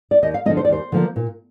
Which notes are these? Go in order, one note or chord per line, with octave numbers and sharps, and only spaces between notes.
D5
D#2 D#5
F5
D3 F3 A#3 D#5
C5
D5
D#2 C5
D3 F3 A#3
A#2